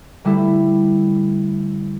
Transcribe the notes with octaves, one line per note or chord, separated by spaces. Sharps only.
D3 G3 A3 E4 A4